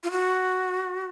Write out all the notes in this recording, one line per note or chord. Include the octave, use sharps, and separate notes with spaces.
F4
F#4